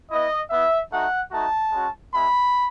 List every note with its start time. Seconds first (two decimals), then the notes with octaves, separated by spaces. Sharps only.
0.10 B3 E4 D#5
0.50 B3 E4 E5
0.91 A3 D#4 F#4 F#5
1.31 A3 D#4 F#4 A5
1.71 G#3 C#4 F#4
2.12 G#3 B3 E4 B5